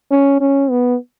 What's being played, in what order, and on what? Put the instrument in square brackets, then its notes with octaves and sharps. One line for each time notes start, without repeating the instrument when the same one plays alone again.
[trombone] C#4
C#4
B3